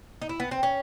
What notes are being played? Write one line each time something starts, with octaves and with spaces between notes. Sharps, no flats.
D#4
E4
B3
C4
C#4